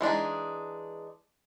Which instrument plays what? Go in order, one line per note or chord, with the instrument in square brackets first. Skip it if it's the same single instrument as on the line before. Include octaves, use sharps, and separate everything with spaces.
[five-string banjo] E3 G#3 D4 D#4